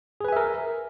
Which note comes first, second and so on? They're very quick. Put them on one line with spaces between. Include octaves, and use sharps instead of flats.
G#4 B4 G#5 E5 A#4